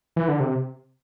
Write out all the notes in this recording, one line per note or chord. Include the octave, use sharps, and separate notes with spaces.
E3
D3
C3